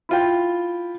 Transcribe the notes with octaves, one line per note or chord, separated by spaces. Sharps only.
E4 F4 G5